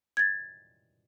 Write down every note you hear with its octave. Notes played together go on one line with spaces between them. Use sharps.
G#6 A6